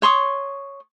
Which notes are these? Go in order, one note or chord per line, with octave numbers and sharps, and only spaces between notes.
C#5 C6 C#6 D#6